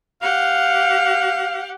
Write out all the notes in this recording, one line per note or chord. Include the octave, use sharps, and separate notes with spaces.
G4 F5 F#5